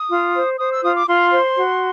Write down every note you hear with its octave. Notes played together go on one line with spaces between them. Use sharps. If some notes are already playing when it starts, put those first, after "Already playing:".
Already playing: D#6
F4
C5
C5 D#6
E6
F4 D#6
D6
F4 C6
C5
F#4